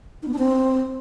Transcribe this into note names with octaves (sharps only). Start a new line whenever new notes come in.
D#4
B3
D4
C4